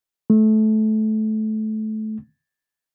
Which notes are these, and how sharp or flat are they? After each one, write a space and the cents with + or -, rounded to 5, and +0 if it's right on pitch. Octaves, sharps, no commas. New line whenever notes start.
A3 -20